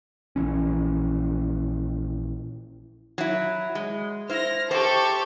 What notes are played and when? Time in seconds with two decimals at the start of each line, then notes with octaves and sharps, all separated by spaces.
0.36 A#1 E3 C#4
3.18 F#3 E4
3.75 G#3
4.29 E4 C5 F6 A#6
4.71 G4 A4 C5 C#6